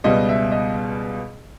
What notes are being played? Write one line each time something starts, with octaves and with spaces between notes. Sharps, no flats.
C#2 B2 G3 B3 D#5
E5
D#5